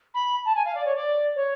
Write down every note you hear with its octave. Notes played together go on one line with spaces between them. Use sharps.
B5
A5
G#5
F5
D5
C#5
D5
C#5